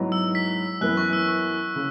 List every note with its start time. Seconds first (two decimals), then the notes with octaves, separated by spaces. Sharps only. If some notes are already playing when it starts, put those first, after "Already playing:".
Already playing: G#2 F#3 B3 E4
0.12 E6
0.35 B6
0.81 F#2 E3 B3 F#6
0.97 C#6
1.13 E6
1.28 C#6
1.76 C#3